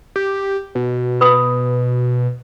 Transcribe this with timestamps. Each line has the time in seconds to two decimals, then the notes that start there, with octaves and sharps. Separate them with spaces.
0.16 G4
0.75 B2
1.21 B4 B5 D#6